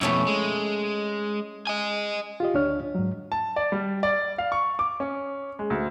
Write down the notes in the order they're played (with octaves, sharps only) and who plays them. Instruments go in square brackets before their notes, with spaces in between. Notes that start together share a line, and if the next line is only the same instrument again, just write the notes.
[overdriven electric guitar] F2 B2 [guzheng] A3 C#4 E4
[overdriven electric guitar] G#3
D#5 G#5
[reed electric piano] F4 G4 D#5
D2 D4 C#5 F6
G#2 F#3
[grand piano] A5
D5
G3
D5
F5
C#6
D6
C#4
G#3
D2